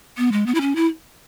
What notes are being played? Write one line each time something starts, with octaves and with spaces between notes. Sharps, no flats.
B3
G#3
B3
E4
C#4
E4